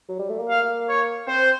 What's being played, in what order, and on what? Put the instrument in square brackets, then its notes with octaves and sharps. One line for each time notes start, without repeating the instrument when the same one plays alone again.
[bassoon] F#3
G3
A3
A#3
[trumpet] F5
C#5
[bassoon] C4 [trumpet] C5